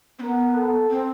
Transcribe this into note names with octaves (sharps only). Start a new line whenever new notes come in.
C4
B3 A#4
A4
C4